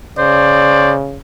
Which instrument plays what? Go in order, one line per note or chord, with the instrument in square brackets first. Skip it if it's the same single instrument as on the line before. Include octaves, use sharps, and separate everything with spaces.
[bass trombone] C#3 [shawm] C5 [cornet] D5